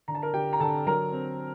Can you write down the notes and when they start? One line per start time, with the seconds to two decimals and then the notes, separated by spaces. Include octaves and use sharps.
0.08 D3 A#5
0.15 A5
0.22 A#4 A#5
0.33 D3 G4 G5
0.53 A#5
0.60 D3 A4 A5
0.87 F#3 A#4 A#5
1.12 C4